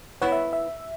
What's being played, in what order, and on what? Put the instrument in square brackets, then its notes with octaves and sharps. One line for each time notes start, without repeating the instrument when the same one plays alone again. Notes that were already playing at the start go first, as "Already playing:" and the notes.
[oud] B3 E4 [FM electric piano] C#5 F#5
[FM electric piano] E5
E5